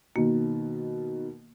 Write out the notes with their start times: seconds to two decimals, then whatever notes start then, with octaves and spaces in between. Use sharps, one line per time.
0.16 B2 D#3 A#3